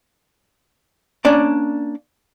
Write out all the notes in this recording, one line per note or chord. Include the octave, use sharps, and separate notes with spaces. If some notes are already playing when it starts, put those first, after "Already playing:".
A#3 C#4 D4 D5